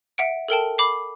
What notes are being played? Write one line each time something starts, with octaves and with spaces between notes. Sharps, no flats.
E5 F#5 D7
A4 A#4 G5 A5
B5 D6 C7